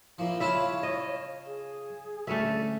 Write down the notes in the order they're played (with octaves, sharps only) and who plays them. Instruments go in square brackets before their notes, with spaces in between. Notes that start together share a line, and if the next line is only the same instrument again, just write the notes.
[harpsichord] A#2 F3 [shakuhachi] E4
[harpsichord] C#3 F4 A5 [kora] E4 E5 [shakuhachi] C#5
[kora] D#5
[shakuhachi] G#4
[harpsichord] D2 [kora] A3 C#4 E5